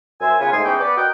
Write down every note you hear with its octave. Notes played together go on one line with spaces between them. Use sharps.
F#2 C5 E5 G#5
C#3 B3 F4 G#5
G#2 A3 D#5 G#5 C6
E2 E3 C#4 D#4 G5
B3 D5
F#4 A#4 D#5 F#5 G5